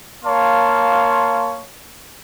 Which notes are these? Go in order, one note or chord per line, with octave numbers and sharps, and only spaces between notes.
A#3 C#5 F5 A5 C6